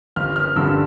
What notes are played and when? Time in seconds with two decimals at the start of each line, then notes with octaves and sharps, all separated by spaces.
0.16 G1 F6
0.36 F6
0.56 G2 D3 G3 E6